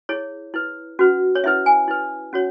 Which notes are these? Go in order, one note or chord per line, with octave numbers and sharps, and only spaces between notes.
E4 G#4 C#5
E4 B4
C#4 F#4 B4
C#5
C#4 E4 B4 E5
G#5
E4 B4
C#4 F#4 C#5